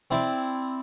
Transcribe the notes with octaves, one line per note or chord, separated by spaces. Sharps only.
C4 E4 D5